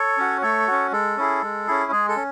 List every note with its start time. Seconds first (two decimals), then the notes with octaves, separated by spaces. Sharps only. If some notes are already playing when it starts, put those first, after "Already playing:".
Already playing: A4 C#5
0.18 C#4 F#4
0.42 A3 A4 C#5
0.68 C#4 F#4
0.92 G#3 A4
1.17 C#4 E4 G#4
1.42 G#3
1.67 C#4 E4 G#4
1.92 G#3 G#4
2.08 A4
2.16 C#4